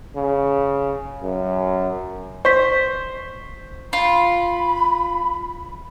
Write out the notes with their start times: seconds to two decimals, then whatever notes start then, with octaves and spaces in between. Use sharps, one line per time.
0.16 C#3
1.22 F#2
2.45 C5 C#6 B6
3.93 F4 B5